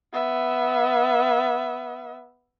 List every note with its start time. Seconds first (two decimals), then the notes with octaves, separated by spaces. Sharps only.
0.13 B3 E5